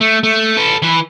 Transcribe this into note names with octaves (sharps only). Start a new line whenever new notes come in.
A3
A3
A4 B4
E3 B4